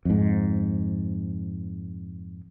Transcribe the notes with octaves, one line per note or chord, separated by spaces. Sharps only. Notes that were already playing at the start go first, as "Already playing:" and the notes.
F2 G#2